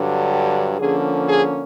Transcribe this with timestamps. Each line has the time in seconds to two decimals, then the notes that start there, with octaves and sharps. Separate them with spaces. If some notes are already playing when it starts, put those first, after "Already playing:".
Already playing: G2 D3 F#3
0.29 G4
0.79 D3 F3 A#3 C#4 G#4
1.28 G#4